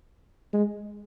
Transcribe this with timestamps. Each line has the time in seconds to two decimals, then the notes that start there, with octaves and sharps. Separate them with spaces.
0.53 G#3